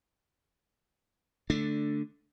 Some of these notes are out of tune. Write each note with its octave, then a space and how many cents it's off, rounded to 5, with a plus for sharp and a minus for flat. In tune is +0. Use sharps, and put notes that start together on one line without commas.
D3 +0 A3 +5 D4 +5